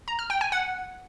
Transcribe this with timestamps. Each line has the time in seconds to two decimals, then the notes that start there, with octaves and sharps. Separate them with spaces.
0.08 A#5
0.19 F6
0.30 G5
0.41 G#5
0.52 F#5